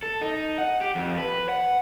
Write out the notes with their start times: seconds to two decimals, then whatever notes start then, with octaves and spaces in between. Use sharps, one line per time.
0.03 A4
0.21 D#4
0.58 F#5
0.81 G4
0.95 F2
1.18 B4
1.49 F#5